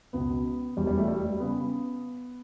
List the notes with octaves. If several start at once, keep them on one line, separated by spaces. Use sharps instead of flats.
C#2 B2 B3
E1 E2 B2 G3
G3
A3
G3
G3
C#3 B3